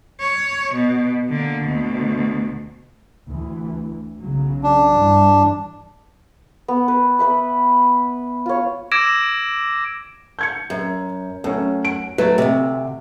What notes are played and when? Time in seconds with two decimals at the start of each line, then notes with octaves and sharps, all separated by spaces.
0.20 C#5
0.74 B2
1.29 D3 A#3
1.65 D2 B2
3.27 D2 E3
4.21 B1 C#3 F#3
4.63 D4
4.94 G2 E3
6.68 B3
6.88 B4
7.19 B4 E5 B5
8.46 F4 C#5
8.92 D6 E6 G#6 A#6 D7 E7
10.39 G6 G#6 C#7
10.70 F#2
11.44 F#2 A3 C#4
11.85 F#5 D7
12.18 F#3 A3 B4
12.38 D2 C3 E5